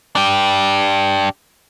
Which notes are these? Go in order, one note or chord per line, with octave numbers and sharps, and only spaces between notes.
D4 G4